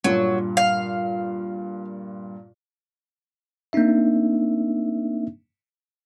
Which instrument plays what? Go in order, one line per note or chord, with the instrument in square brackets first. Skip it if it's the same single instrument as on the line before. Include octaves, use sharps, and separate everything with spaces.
[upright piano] G2 A#2 [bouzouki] F#3
[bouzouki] F5
[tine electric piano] A#3 C4 D4 D#4 E5